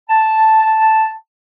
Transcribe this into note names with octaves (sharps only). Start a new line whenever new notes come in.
A5